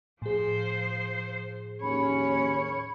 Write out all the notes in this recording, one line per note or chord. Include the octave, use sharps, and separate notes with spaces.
A2 F3 G#4 C5
A#1 D#2 C#4 C#5 B5